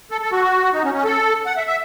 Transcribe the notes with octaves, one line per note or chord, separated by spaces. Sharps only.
A4
A4
F#4
D#4
C#4
C#4
A4
F#5
E5
E5